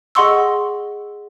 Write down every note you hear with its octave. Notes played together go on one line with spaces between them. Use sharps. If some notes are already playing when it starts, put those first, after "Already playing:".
G#4 D#5 F#5 C6 C#6 E6